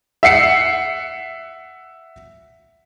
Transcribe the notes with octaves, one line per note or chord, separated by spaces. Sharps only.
E5 F#5 C7 C#7